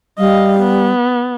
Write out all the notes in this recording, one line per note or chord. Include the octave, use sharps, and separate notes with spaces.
G3 D#5 F5
B3